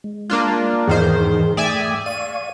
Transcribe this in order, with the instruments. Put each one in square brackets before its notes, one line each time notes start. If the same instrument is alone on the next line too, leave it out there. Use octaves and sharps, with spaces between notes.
[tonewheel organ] G#3
[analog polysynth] A#3 D4 F4
[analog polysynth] E2 D#3 C5 [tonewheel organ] G#2 E3 G#4
[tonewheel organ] A3 G5 D#6 [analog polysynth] D5 E5 G#5
[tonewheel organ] D5 F5 C#6 [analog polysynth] D#7